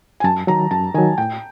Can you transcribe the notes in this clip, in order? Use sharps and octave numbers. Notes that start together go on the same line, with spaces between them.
G#5
F#2 A5
D#3 F#3 A#5
F#2 A5
D#3 F#3 G#5
A2 G5